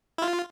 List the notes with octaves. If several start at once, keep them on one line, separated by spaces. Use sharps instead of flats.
E4
F4